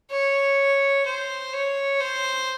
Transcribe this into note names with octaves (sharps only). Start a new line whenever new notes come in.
C#5
C5
C#5
C5